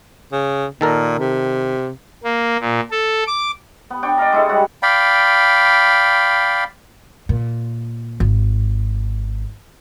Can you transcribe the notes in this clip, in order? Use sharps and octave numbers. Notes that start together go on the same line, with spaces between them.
C#3
A#2 D#3 A4 A#4
C3
A#3
A#2
A4
D6
B3
D4 G5 C#6
D5 D#5 F5 A#5
G#3 E4 A4
G3 F#4 G#4 F#5
D5 F5 G5 B5
A#2
G#1